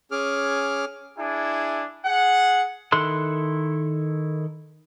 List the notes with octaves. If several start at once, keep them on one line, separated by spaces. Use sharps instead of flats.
C#4 G#4 D6 F6
D4 E4 G#4
G#4 F#5
D#3 E4 A4 C6 F#6